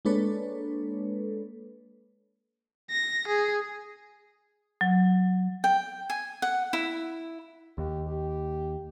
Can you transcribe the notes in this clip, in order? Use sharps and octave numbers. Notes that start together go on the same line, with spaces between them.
G#3 A#3 D4 A4 B4 C#5
A#6
G#4
F#3
G5
G#5
F#5
E4
D#2 G4
G4